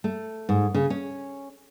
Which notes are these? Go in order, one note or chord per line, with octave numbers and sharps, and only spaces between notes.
A3
G#2
C#3
C#4